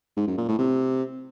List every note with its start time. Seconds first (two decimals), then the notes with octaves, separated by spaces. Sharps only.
0.17 G#2
0.27 F#2
0.38 A#2
0.48 A2
0.59 C3